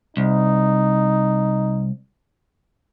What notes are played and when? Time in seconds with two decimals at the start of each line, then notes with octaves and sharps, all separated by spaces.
0.17 C2 D#4